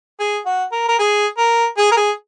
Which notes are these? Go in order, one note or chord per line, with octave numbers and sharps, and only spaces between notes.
G#4
F#4
A#4
A#4
G#4
A#4
G#4
A#4
G#4